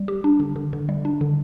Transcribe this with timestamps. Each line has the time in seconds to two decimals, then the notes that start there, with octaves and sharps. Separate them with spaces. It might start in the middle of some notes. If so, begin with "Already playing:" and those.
Already playing: G3
0.08 G4
0.24 D4
0.40 D3
0.56 D3
0.73 D3
0.89 G3
1.05 D4
1.21 D3